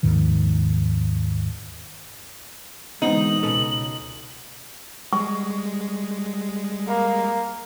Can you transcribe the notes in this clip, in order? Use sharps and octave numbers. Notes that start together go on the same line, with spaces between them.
D#2 G#2 D#3 F3
B2 D3 E3 G#3 B3 C4 D#4 F#7
C#2 B2 C#4 A4 B4
G3 G#3 C#6
A#3